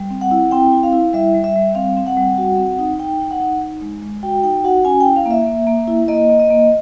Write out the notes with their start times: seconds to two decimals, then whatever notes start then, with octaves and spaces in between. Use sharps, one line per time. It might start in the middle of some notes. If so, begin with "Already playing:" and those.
Already playing: G3
0.10 C4
0.21 F#5
0.31 E4
0.51 C4 G5
0.73 E4
0.83 F5
0.93 E4
1.13 G3 E5
1.34 G3
1.44 E5
1.56 G3
1.75 C4 F5
1.97 C4
2.07 F#5
2.17 G3
2.38 F#4
2.58 C4
2.79 D#4
2.99 D#4 G5
3.20 D#4
3.31 F#5
3.40 D#4
3.61 D#4
3.82 G#3
4.02 G#3
4.23 F#4 G5
4.43 D#4 G5
4.64 F#4 F#5
4.85 C#4 G#5
5.01 G5
5.06 E4
5.16 F5
5.26 A#3
5.31 E5
5.46 A#3
5.67 A#3
5.87 E4
6.08 A#3 D#5
6.30 A#3
6.39 D#5
6.50 A#3